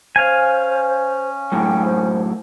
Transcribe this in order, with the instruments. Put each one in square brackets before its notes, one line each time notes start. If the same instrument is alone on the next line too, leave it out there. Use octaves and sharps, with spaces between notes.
[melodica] C#4 [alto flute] C5 [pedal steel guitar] F5 G#5
[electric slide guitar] F#2 A2 [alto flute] G5
[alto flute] C5